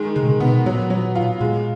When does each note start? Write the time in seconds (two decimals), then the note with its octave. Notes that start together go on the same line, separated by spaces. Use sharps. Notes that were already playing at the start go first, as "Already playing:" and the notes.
Already playing: D#3 G#3
0.16 C#3 G#3
0.23 B2
0.31 C#3
0.40 B2 B3
0.66 A#2 F#3
0.90 F#3
1.16 F4
1.41 A#2 G#3